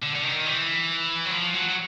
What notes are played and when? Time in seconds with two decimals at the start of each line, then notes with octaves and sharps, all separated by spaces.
0.03 D3
0.16 D3
0.24 D#3
0.46 E3
1.26 F#3
1.31 F3
1.54 F#3
1.69 F#3